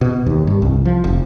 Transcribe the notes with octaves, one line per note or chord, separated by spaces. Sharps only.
B2
D#2
G2
C2
F3
F1